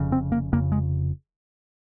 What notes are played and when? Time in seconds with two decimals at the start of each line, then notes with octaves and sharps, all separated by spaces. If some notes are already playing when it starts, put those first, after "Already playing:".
Already playing: F1 F2 C#3
0.12 C4
0.32 A#3
0.52 F1 F2 C#3 A#3
0.72 G#3